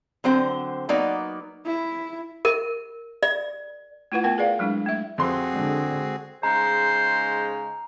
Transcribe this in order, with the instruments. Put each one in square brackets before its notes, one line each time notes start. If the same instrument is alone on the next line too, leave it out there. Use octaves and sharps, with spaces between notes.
[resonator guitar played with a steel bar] D3 F#3 C4 C5
F#3 A#3 B3 D#4 D5
[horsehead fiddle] E4
[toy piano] A#4
D5
[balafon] A3 E4 F4 B4 F#5
A3 B3 A#4 G5
G#4 B4 D5 F5
F#3 G#3 D4 E4
A3 E5
[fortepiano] F2 C6 [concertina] C4 F#4 G#4
[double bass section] D3 G#3
[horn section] C#3 G#3 D#4 [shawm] C5 [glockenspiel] A#5